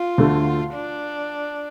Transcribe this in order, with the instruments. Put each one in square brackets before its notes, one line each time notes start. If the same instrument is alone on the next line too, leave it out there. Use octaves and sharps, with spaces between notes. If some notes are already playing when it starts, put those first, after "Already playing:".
Already playing: [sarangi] F4
[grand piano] D2 D3 A3
[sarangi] D4